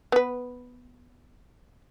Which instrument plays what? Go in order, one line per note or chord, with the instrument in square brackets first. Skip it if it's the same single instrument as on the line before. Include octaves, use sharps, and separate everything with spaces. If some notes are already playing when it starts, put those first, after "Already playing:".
[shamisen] B3 B4